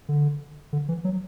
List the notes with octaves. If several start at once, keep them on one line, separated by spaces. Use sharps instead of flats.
D3
D3
E3
F#3